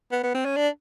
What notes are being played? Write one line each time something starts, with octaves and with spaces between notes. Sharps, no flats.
B3
B3
C4
C#4
D4